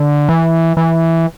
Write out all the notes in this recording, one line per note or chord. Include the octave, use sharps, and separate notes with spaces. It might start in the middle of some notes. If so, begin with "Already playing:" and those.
Already playing: D3
E3
E3